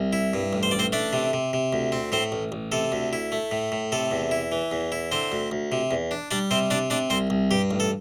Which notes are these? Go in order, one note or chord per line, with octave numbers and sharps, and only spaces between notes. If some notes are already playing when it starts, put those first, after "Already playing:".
Already playing: C2
E4
G2
A1
C5
A1 D5
C4 C5
A3 D4 D5
C3
C3
C3
D2
C4
A2 C4 C5
A1
A1
C3 A4
D2
E4
A3
A2
A2
C3 A4
E2
E4
E3
E2
E4
D3 C4 C5
D2
D2
C3
E2
D4
G3 D4 D5
C3 C4 C5
C3 D4 D5
C3 D4 D5
C2 C4 C5
C2
G2 G4
A1
A4